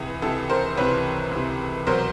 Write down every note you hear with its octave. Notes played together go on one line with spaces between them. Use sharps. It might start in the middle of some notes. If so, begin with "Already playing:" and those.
Already playing: C#2 C3 E3 G#4
C#2 C3 E3 A4
A#4 C5
C#2 C3 E3 B4 C#5
C#2 C3 E3
C2 B2 F#3 A#4 C5